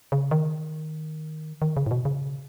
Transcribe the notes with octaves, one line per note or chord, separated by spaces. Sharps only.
C#3
D#3
D#3
C#3
A2
B2
C#3